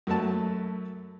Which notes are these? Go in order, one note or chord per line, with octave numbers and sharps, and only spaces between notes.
F#2 F#3 A3 A5